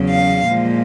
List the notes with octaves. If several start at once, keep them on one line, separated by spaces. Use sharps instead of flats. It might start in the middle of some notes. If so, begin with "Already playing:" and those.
Already playing: E2 C#3 F#3
F5
A#2 F3 G#3